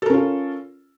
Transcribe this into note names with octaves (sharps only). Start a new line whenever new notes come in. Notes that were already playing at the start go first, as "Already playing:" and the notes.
C#4 F4 A4 A#4